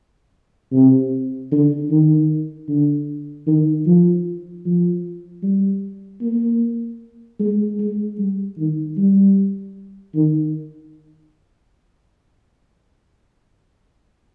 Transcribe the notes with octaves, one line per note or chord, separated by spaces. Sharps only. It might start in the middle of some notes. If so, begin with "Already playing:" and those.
C3
D3
D#3
D3
D#3
F3
F3
G3
A#3
G#3
G#3
G3
D#3
G3
D#3